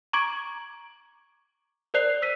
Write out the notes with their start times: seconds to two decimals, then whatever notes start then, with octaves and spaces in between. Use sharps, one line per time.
0.13 A#5 C#6 D6 G#6 D7 F#7
1.94 A#4 C5 D5 F#6 C7 F7
2.22 E6 B6 D#7